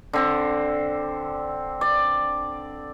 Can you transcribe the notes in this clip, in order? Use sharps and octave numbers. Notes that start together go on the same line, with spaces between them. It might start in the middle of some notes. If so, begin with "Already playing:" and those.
D3 C4
D5